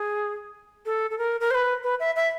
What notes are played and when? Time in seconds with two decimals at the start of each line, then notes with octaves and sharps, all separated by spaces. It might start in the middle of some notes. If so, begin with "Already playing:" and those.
Already playing: G#4
0.86 A4
1.11 A4
1.18 A#4
1.41 A#4
1.51 C5
1.55 B4
1.84 B4
2.00 E5
2.16 E5